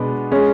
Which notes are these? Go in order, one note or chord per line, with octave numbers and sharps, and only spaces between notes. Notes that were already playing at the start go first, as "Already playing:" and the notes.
Already playing: B2 G#3 B3 D4
G#3 C#4